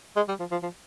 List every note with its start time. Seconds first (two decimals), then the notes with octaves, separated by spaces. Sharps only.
0.16 G#3
0.28 G3
0.40 F3
0.51 F3
0.63 F3